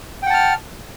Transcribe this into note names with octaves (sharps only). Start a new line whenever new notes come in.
F#5 G5 A5 F6